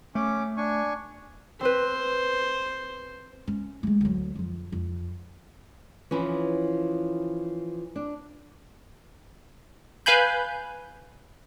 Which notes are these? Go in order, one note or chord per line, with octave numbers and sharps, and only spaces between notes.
A3 C#4 D6
D4 G#5 C#6
C4 B4 C5
C#4
G#3 A3
D2 F#3
F2 F3
F2
E3 F3 C#4
D4
B4 F5 G#5 B5 G6